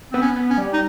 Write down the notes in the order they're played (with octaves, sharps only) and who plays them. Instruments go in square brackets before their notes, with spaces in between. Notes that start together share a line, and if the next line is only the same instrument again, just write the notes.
[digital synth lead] B3 [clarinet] C4
[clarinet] C#4
[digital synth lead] B3
[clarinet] C#4
[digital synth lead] G3
[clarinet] D#4